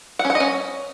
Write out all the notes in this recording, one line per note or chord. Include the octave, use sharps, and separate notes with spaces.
F#5
C#4
F#5
D#5
C#4